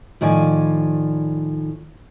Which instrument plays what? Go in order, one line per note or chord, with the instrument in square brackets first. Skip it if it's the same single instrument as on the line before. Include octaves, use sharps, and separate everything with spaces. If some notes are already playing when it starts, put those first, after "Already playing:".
[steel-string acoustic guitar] A2 D#3 F3 D5 G#5